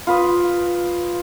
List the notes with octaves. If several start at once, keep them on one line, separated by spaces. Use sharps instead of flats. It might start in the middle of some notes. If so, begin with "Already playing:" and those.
F4 B4 D#6